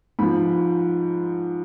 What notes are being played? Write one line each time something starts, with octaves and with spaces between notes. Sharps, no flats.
G#2 F3 B5